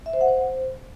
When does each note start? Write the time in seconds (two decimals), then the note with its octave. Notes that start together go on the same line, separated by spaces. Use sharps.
0.06 E5
0.13 C5
0.21 F#5
0.28 C5